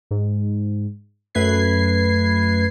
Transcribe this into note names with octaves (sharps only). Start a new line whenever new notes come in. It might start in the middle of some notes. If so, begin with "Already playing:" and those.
G#2
F#2 A3 B4 G#6 C7